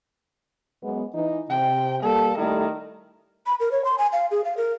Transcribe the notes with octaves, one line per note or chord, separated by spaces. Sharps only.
F#2 G#3 B3
E3 D#4
C3 G5
G3 A#3 A4
D#3 G3 A3 E4
B5
A#4
C#5
C6
G#5
F5
G#4
F5
A#4